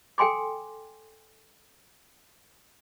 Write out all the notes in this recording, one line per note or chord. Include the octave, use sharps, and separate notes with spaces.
A4 G5 G#5 C6 D6